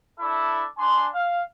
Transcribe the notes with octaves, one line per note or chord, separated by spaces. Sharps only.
D4 E4 A4 D5 E5
D4 G#5 C6
F5